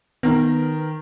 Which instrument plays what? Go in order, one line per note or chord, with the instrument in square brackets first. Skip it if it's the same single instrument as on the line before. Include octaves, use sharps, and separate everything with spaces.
[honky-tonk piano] D#3 A#4 [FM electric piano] B3